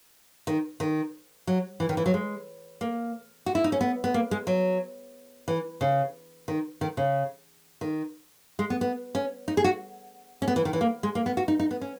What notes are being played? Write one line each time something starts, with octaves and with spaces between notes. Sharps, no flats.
D#3
D#3
F#3
E3
D#3
E3
F#3
G#3
A#3
F#4
E4
D#4
C#4
B3
B3
A#3
G#3
F#3
E3
C#3
D#3
D#3
C#3
D#3
G#3
B3
B3
C#4
D#4
G#4
F#4
C#4
B3
E3
D#3
E3
A#3
G#3
A#3
B3
F#4
D#4
D#4
B3
C#4